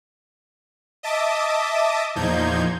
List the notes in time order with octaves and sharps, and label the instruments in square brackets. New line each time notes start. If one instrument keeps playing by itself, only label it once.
[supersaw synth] D#5 E5 A5 D6 D#6
E2 A#2 F3 D#4 G6 G#6